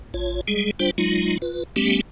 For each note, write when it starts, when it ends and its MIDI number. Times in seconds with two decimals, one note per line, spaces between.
0.14 0.41 33
0.14 0.41 65
0.14 0.41 73
0.48 0.71 55
0.48 0.71 56
0.48 0.71 68
0.80 0.91 55
0.80 0.91 62
0.80 0.91 65
0.80 0.91 72
0.80 0.91 79
0.98 1.38 54
0.98 1.38 56
0.98 1.38 63
0.98 1.38 65
1.42 1.64 65
1.42 1.64 71
1.76 2.01 55
1.76 2.01 57
1.76 2.01 59
1.76 2.01 61
1.76 2.01 67